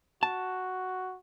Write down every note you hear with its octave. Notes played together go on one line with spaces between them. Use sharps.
F#4 A5